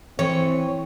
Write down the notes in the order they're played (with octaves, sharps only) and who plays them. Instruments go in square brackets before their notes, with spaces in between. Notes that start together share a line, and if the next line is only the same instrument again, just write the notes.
[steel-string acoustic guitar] E3 [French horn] C4 [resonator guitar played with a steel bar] C#5